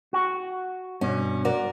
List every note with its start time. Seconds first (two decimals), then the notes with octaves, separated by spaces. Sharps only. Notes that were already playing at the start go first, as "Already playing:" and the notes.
0.13 F#4
1.01 G2 B2 C#4
1.45 F#4 A#4 D5